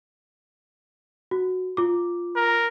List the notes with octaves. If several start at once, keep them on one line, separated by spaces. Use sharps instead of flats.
F#4
F4 D6
A#4